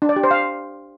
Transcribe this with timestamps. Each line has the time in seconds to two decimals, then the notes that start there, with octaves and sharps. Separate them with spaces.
0.02 D4
0.09 D5
0.16 G4
0.24 C5
0.31 F5